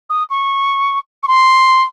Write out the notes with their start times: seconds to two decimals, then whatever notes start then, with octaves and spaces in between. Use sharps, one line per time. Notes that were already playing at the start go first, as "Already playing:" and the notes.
0.09 D#6
0.30 C#6
1.23 C#6
1.27 C6